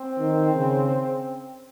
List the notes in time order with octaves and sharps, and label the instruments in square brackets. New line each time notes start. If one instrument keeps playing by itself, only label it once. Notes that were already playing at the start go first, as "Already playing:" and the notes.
Already playing: [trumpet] C4
[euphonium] D#3
C#3